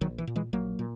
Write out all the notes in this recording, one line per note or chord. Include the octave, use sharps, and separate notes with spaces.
A#1 D#3 F#3
E3
A#2
E3 G#3
A#1 F#3 A#3
A#2